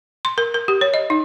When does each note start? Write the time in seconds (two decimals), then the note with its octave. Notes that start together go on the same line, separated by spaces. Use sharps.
0.25 C6
0.38 A#4
0.54 A#4
0.68 G4
0.81 C#5
0.94 D#5
1.10 D#4